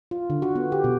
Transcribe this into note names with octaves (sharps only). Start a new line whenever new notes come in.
F4
D3
F#4
B3
G4
B2